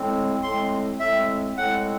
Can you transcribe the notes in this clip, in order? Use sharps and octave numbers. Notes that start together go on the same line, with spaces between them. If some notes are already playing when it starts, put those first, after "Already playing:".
Already playing: A2 G#3 C4
A2 G#3 C4 C6
A2 G#3 C4 E5
A2 G#3 C4 F#5